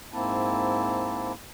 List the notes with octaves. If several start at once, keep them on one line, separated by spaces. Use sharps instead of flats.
G#2 A#3 C4 E4 A5